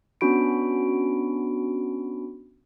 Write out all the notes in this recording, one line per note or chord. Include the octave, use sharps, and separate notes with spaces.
B3 C#4 D4 F#4 B5 D7